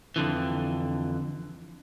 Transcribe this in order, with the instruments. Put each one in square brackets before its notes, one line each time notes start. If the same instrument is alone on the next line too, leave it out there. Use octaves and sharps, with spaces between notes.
[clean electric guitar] F2 D3 E3